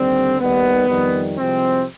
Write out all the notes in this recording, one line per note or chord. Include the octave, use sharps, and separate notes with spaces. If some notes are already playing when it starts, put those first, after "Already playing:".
Already playing: D#2 D3 G3 C4
D#2 D#3 G3 B3
F2 D#3 G3
C2 C3 F3 G#3 C4